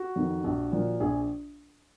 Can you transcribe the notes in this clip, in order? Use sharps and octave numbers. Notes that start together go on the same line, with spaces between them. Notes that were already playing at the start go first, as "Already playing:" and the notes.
Already playing: F#4
F2 D#3
A#1
A#2 F3
A#1 G#4